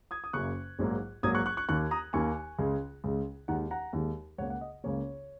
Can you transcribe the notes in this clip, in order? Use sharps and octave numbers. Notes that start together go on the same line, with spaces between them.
D#6 G#6
D#6
F#1 F#2 C#3 A#3 C#6 F#6
A#1 G#2 F#3 A#3
A#1 G#2 F#3 A#3 D#6 G#6
C#6 F#6
C#6 F#6
C#6 F#6
D#2 D#3 A#3 C#6 F#6
A#5 D#6
D#2 D#3 A#3 G#5 C#6
C#2 C#3 G#3
C#2 C#3 G#3
D#2 D#3 G#3 F#5 A#5
F#5 A#5
D#2 D#3 G#3
C#2 C#3 A#3 C#5 F#5
F#5
D#5
C#2 C#3 A#3 C#5